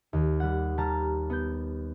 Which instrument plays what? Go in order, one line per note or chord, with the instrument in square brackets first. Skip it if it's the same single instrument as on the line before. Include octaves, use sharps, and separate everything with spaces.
[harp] D#2
G3 F#5
G3 A5 A#5 F6
B3 G6